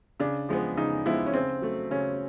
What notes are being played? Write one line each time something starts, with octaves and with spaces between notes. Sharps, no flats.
C#3 D4
F3 G#3 B3
C#3 D#4
F3 G#3 B3 E4
C#4
C#3 C4
F#3 A3
C#3 C#4